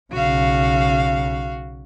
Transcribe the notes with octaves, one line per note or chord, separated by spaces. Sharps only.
B1 C#3 F#4 F5